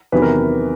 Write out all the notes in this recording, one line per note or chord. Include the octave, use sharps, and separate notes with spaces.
E2 C3 D#3 F#3 B3 B4
A#4